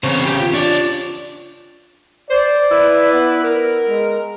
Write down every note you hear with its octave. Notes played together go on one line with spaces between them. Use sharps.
E2 C#3 C4 C5 C#5
G4
F4
D4 C#5 D5
C5 D5
E4 B4
B3
A#4
G#3